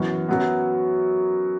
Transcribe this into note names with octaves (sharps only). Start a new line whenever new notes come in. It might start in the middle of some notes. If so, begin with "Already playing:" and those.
Already playing: F#2 E3 B3 C#6
F#2 F#3 B3